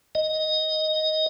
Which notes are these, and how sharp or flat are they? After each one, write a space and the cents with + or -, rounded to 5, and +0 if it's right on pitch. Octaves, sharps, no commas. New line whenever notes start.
D#5 +5